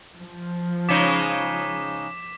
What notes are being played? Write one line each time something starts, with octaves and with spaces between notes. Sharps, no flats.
F3
C#3 G#3 D#4 D6 B6 E7